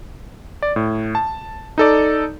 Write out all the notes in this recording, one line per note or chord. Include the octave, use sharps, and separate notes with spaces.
D5
A2
A5
D#4 A4 D5